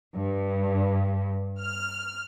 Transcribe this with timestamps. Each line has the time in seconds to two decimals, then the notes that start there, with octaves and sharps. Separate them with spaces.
0.16 G2
1.58 F6